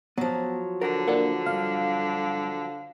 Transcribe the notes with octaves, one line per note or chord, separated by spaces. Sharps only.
F3 F#3 B3
D3 A#4 F#5 A#5
A#3 D4 E4 A4 F#5
C2 G2 F5